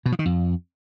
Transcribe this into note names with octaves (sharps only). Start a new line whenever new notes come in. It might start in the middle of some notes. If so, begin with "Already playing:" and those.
B2
F3
D#3
F2